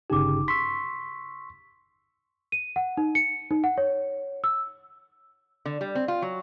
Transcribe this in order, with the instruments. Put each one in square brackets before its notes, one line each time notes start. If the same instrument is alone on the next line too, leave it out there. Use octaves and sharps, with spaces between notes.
[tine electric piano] G1 C#3 G4 [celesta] D#4 D6
[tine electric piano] C6 C#6 E6 [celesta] B6
[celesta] D#7
F#5
D#4
C#7
D#4
F#5
C#5
E6
[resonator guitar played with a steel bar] D3
G3
C4
F4
F#3